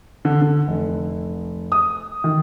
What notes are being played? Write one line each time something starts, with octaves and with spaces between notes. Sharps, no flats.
D3
D3
F1
D#6
D#3